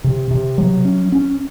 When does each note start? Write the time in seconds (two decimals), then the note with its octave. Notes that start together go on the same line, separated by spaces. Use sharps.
0.04 C3
0.31 C3
0.58 F#3
0.85 C#4
1.12 C#4